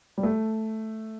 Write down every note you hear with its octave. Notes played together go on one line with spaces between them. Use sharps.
G3
A3